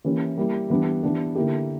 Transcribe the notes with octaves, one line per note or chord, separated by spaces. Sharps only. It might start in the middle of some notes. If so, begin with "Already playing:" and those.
E3 A#3 C#4 E4 G4
G3 A#3 E4
E3 G3 B3 D4
E3 B3 D4 G4
D3 A#3 E4 G4